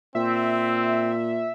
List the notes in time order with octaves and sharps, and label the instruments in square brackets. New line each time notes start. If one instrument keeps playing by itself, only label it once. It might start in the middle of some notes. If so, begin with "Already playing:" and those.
[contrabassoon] A#2 [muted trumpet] C4 [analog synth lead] E5